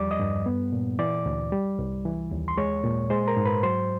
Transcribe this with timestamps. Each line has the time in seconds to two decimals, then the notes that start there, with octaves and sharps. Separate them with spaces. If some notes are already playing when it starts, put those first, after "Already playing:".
Already playing: E2 F3 G3 D5 D6
0.11 D#5 D#6
0.20 G2
0.46 B3
0.73 A#2
0.99 E3 D5 D6
1.26 D2
1.52 G3
1.79 C2
2.05 E3
2.31 D#2
2.48 C6
2.57 G#3 C#5 C#6
2.84 A#2
3.10 G#3 C5 C6
3.28 A#4 A#5
3.37 G#2
3.46 B4 B5
3.63 F#3 C5 C6